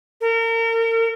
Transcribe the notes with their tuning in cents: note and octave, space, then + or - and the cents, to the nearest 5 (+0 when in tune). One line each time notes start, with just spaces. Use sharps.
A#4 -35